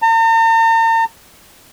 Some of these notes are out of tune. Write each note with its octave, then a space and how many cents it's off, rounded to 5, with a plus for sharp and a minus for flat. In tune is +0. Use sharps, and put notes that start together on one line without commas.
A#5 -45